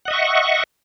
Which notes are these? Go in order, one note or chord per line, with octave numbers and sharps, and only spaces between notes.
D#5 E5 F#5 C#6